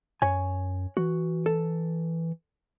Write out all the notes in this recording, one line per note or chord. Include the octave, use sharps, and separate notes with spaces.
F#2 C#5 G#5
E3 F#4
A4